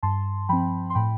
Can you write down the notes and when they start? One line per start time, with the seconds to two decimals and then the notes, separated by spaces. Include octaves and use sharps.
0.03 G2 A5 C6
0.49 F3 C4 G5 B5
0.90 C6
0.95 A2 G5 B5